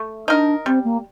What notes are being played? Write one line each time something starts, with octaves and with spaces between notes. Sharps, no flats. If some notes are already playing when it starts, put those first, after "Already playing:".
Already playing: A3
D4 D#4 A#4
G3 C4
A#3